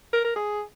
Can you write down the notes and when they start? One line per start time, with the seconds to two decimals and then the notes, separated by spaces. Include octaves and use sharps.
0.13 A#4
0.24 A#4
0.36 G#4